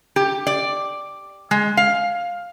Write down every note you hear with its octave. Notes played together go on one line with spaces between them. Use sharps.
G4
D5
G#3
F5